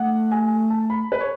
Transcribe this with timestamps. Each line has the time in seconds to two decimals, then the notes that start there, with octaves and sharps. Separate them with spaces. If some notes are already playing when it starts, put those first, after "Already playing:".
Already playing: A3 F#5
0.31 G#5
0.70 A5
0.90 B5
1.12 B4
1.21 C#5